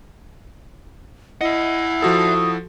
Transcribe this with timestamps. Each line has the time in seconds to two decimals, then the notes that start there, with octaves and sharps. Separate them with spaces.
1.41 E4 D#5 E5 F#5
2.02 F3 F#4 A4 D#6